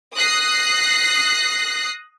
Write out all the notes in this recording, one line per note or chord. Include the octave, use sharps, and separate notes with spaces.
D#6 F#6 A#6 C7